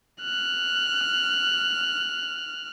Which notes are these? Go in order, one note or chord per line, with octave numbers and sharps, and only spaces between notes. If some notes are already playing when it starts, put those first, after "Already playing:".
F6 F#6